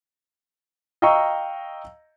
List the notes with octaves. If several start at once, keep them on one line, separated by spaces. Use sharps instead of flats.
D#5 F5 G5 A#5 C#6 E6